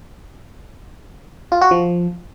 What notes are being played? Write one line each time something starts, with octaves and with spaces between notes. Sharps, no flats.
F4
F#4
F3